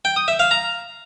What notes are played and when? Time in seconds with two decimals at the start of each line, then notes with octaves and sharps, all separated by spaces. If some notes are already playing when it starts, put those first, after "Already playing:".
0.05 G5
0.16 D#6
0.28 E5
0.39 F5
0.51 A#5